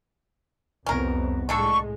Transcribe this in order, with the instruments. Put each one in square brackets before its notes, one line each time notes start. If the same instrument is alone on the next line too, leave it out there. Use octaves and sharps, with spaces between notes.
[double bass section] C2 F2 B3 [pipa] C#4 A#4
[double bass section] A2 G#3 [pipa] D3 D4 A4 [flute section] C#6